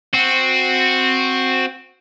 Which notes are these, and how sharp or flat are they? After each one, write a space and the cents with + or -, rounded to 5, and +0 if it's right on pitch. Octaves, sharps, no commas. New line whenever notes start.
C4 +0 F#4 -10